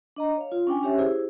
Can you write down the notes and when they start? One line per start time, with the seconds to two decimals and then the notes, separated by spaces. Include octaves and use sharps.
0.16 D4 D#5 A#5
0.37 C#5 F5
0.52 F4
0.67 C#4 D4 G5 G#5
0.83 C#4 G4 C#5 E5
0.98 E4 G4 G#4 C5